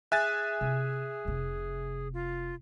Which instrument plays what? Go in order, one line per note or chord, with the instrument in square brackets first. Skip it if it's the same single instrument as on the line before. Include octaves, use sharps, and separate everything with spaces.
[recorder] G#4 [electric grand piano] E5 G#5 A6 [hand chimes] F#6
[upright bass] C3 E4
F1 C3
[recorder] F4